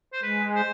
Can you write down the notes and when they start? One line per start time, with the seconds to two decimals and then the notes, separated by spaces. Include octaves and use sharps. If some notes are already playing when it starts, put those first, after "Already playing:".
0.13 C5
0.23 G#3 B4
0.55 C5